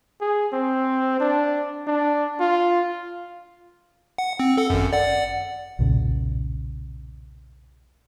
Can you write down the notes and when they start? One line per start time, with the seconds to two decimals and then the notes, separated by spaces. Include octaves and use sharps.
0.21 G#4
0.53 C4
1.20 D4
1.87 D4
2.40 F4
4.18 F#5
4.40 C4
4.57 A4 F#5
4.70 G#1 F#2
4.93 D5 F#5
5.79 B1 E2 A#2 C#3